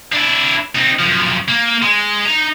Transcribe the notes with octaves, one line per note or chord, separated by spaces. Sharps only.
D4 E4
C4 D#4
F#2 F3
A#3
G#3
D#4 A#5